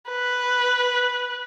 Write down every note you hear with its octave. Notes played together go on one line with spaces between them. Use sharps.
B4